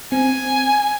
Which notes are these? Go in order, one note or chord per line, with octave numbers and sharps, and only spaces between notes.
C4 G#5